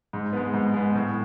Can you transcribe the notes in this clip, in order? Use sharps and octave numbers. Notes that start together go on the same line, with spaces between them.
G#2
G#3 B3
G#2
G#3 B3
A2